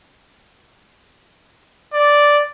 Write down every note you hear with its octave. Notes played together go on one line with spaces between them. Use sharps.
D5